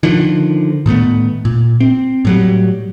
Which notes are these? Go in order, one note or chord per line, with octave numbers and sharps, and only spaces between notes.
D3 D#3 F3
A2 D#3 A3 B3
A#2
C4
A2 F#3 G3